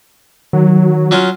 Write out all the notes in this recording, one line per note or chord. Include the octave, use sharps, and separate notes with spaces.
D#3 F#3
F#3 C#4 F4